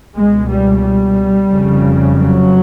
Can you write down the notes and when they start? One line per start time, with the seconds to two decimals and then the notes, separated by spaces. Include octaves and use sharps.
0.16 C#2 B2 G#3
0.49 G3
0.83 G3
1.50 F1 F2 C#3
2.16 F#3